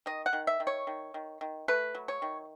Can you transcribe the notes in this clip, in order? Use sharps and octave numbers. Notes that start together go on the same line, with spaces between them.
D#3 D#5
F#5
D#3
E5
D#3
C#5
D#3
D#3
D#3
A3 B4
F#3
C#5
D#3